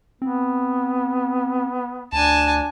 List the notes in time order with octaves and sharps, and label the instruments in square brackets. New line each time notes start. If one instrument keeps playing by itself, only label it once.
[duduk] B3 [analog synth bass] C4
[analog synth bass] D2 [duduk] D4 [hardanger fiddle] G#5 A5